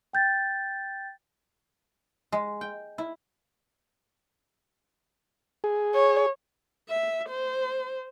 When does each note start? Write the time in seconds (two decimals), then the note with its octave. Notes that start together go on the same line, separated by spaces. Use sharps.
0.13 G5 G6 A6
2.32 G#3
2.61 G5
2.98 E4
5.64 G#4
5.95 C#5
6.89 E5
7.29 C5